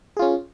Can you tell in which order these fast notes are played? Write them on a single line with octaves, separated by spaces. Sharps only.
G#4 F4 C#4